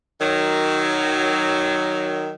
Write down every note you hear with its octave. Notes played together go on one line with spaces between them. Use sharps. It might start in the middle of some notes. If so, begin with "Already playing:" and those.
D#3 F#3